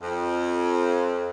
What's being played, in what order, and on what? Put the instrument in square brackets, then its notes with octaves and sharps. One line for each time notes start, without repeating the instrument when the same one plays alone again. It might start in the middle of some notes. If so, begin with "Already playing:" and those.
[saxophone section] F2